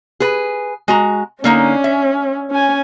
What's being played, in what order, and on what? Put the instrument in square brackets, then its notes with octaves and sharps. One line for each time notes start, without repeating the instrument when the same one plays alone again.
[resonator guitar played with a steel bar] G#4 B4
G#3 F#4 A#5
[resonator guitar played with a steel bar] D3 A#3 D#4 [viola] C#4
[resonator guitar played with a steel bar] E5
[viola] C#4 G#5